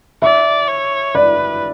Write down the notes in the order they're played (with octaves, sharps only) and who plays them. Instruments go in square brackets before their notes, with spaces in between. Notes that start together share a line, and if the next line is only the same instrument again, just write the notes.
[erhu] D5 [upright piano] E5
[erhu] C#5
[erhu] B4 [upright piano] D5